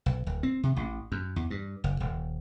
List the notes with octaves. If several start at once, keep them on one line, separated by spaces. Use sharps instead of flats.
B1
D1
C4
C3
A1
F#2
E2
G2
F#1
D#1